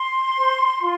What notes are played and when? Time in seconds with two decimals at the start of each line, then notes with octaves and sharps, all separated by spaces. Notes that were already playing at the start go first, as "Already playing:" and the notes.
Already playing: C6
0.37 C5
0.80 F4